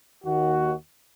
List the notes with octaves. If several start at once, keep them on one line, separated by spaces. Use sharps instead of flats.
D#2 D#3 F#4